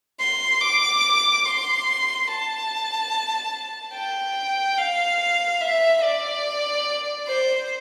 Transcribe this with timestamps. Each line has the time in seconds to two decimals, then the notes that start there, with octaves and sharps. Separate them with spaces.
0.20 C6
0.61 D6
1.45 C6
2.28 A5
3.94 G5
4.77 F5
5.61 E5
6.03 D5
7.27 C5